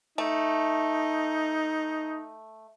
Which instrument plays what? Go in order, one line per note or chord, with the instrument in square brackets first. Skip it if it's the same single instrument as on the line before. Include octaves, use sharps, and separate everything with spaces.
[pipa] A3 [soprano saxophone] D#4